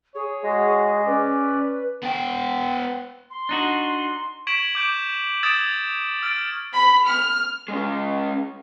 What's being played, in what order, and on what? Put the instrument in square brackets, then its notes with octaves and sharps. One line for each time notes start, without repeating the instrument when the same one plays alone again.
[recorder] G#4 [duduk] C#5
[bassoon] G#3 [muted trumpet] F#4
[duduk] C#4 [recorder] B4 [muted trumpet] D5
[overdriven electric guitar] B3 G5
[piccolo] C6
[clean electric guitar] D4 D#4 F#4
[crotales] C#6 G#6 B6 D7 E7 F#7
D6 G6 D7
D#6 E6 G#6 A6 D7 E7
E6 F6 A6 D7
[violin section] B5
F6
[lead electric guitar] G#3 C#4